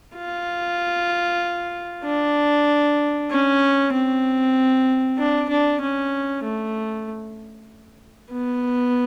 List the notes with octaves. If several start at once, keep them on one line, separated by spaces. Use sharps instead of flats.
F4
D4
C#4
C4
D4
D4
C#4
A3
B3